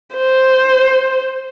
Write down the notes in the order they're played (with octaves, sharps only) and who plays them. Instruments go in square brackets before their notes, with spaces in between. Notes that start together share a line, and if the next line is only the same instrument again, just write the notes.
[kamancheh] C5